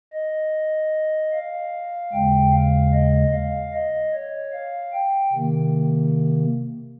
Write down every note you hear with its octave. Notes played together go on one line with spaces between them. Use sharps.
D#5
F5
D#2 C#3 G#3 G5
F5
D#5
F5
D#5
C#5
F5
G5
C3 D#3 A#3